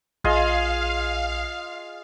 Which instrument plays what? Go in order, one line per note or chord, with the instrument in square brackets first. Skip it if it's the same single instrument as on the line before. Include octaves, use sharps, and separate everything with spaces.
[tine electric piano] A#1 [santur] F4 G#4 D#5 [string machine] F5